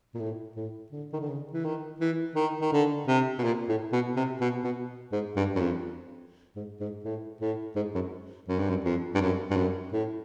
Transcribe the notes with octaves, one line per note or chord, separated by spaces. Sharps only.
A#2
A2
A2
D3
D#3
D3
C#3
E3
D#3
E3
D#3
D#3
D3
C3
B2
A#2
A2
B2
C3
B2
B2
G#2
G2
F#2
F2
G#2
G#2
A2
A2
G#2
F#2
F#2
G2
F#2
F2
G2
F#2
G2
F#2
A2